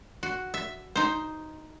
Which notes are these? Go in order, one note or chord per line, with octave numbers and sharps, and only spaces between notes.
F#4
E5
D#4 C5